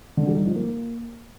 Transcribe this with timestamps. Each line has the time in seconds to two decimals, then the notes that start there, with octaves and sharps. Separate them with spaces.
0.17 D3
0.27 G3
0.36 D#4
0.46 F3
0.55 A#3